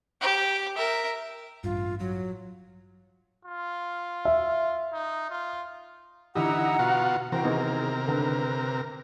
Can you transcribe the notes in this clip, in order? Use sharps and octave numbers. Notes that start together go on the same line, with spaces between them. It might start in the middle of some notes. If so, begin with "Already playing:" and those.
G4
A#4 E5
A1 G2 F4
F#3
F4
E5
D#4
F4
D3 E3 D#4 E4 G4 F#5 A#5
B2 F4 F#4
C3 E3 F#4 A#4 C5 G5
D#3 B3 D#4 G#4
D3 A4 B4